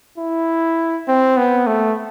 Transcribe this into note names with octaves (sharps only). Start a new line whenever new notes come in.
E4
C4
B3
A3